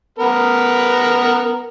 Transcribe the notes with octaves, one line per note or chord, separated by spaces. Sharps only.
B3 A#4 B4